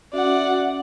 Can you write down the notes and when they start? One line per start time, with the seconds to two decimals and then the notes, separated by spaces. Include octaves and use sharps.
0.13 C#4 F#4 D5 E5 F#5